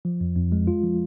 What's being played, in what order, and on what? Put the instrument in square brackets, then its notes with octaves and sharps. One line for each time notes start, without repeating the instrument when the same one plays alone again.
[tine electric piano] F3
F2
F2
G#3
F4
F3